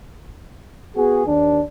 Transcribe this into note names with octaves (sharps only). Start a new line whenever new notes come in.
B3 F#4 G#4
D#2 D4